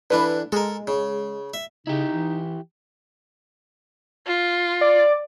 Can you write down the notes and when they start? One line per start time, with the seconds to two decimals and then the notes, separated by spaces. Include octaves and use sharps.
0.11 D3 E3 D4 B4
0.52 G#3 A4 A#4
0.87 C#3
1.54 E5
1.87 C#3 D#4 E4 G4
2.12 E3
4.26 F4
4.81 D5